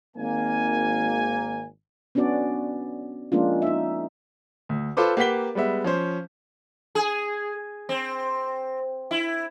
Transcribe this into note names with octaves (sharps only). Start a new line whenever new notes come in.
G#1 A#3 G#5
B3 C#4 D4 F#4 D5
F3 G#3 A#3 C#4 D4 F4
D#4 E5
D2
F4 A4 B4 C5 D6
A#3 G4 B4 F#5 B6 G7
G3 G#3 B3 E5
F3 C#4 C5
G#4
C4
E4